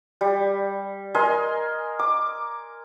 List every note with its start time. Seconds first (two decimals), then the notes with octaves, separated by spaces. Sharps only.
0.21 G3
1.15 A#4 D#5 G#5 C6
1.99 D6